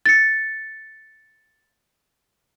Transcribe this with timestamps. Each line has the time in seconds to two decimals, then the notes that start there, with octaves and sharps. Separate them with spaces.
0.06 A6 C#7